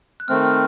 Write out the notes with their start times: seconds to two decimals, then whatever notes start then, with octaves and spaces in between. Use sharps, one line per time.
0.20 F#6
0.28 D#3 A3 C4 F6
0.45 F6